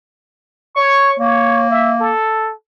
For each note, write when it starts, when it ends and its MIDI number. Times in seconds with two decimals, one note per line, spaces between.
0.76 1.19 73
0.76 1.11 85
1.19 2.11 58
1.19 1.66 73
1.70 1.94 76
2.00 2.53 69